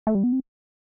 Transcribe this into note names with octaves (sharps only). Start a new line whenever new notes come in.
A3
G3
B3
C4